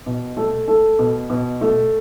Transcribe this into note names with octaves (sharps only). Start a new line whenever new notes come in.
B2
A3 A4
A3 A4
B2
B2
A3